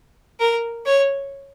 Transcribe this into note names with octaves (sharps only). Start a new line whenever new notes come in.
A#4
C#5